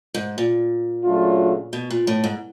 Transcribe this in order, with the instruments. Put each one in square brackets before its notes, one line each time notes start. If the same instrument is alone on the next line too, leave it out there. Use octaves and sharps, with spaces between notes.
[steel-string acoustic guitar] G#2
A#2
[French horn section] C#3 F#3 A3 D4 F4
[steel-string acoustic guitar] B2
A#2
A2
G#2